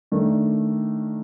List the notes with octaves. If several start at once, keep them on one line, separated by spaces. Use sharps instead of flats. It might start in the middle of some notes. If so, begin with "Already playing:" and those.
D#3 A3 D4